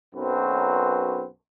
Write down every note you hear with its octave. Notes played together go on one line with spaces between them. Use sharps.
B1 F#2 C4 F#4 B4